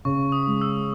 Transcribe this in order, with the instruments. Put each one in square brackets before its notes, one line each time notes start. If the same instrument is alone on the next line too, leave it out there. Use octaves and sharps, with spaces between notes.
[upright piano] C#3 [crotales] C#6
[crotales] D#6
[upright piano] G#3
[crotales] E6